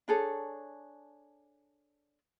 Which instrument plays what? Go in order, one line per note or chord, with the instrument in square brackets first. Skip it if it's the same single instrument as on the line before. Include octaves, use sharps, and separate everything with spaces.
[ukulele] D4 G#4 A4 C#5